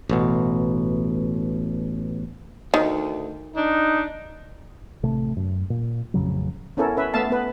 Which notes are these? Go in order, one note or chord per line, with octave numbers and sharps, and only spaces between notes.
A1 B2
D2 D#3
D4 D#4
A1 C3 A3
F#2
A#2
A1 F2 C#3 F#3
B3 C#4 E4 A4 A#4
C#4 B4 E5
A3 B3 E5 F5 A5
B3 B4